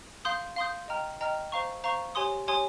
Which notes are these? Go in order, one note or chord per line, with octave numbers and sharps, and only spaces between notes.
F5 C6 D#6 G6
F5 C6 D#6 G6
D#5 G5 A#5 F6
D#5 G5 A#5 F6
C5 F5 A#5 C#6
C5 F5 A#5 C#6
G4 C#5 G#5 C6 D#6
G4 C#5 G#5 C6 D#6